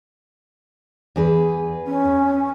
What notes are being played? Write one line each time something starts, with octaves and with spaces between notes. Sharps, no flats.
E2 G#4 B4
C#4